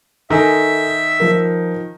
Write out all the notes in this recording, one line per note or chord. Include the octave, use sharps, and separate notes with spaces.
D#3 A4 E5 G#5
F3 A#4